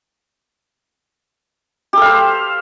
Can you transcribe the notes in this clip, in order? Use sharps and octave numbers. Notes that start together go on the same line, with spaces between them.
G4 A4 C5 F5